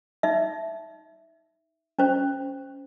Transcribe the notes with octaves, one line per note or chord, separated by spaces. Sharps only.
D#4 E5
C#4 C5